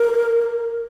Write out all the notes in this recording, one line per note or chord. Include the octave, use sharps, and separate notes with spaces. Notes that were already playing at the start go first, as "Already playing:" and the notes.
Already playing: A#4